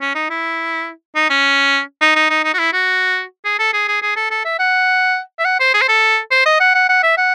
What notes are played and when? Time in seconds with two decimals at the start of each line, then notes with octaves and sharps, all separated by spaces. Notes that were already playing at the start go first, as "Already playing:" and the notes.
0.01 C#4
0.15 D#4
0.30 E4
1.15 D#4
1.30 C#4
2.01 D#4
2.16 D#4
2.30 D#4
2.44 D#4
2.54 F#4
2.59 E4
2.73 F#4
3.45 G#4
3.59 A4
3.73 G#4
3.88 G#4
4.02 G#4
4.16 A4
4.31 A4
4.45 E5
4.59 F#5
5.39 E5
5.45 F#5
5.60 C5
5.74 G#4
5.82 C5
5.88 A4
6.31 C5
6.46 D#5
6.60 F#5
6.74 F#5
6.89 F#5
7.03 E5
7.17 F#5